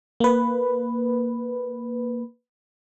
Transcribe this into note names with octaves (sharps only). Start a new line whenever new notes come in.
A#3 B4